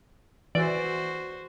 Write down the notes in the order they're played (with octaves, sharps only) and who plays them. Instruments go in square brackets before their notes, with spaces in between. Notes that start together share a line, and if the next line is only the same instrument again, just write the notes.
[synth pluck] E3 D5 [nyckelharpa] F#4 C5